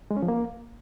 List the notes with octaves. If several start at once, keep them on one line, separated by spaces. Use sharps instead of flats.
G#3
C#4
F3
A#3